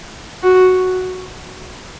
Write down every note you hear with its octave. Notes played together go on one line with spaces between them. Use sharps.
F#4